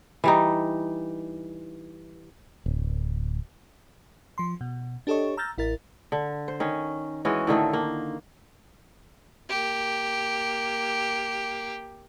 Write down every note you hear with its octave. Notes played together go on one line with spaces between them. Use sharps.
E3 G3 D#4
D1
F3 C6
B2
D4 G4 A4 C#5 D#5 C#6
A#5 E6 F6 G6 A6 A#6
A1 E4 A#4 A6
D3
C5
D#3 C#4
E3 G#3 C#4 F#4
A2 D3 D#3 A3
A#3
A#3 G4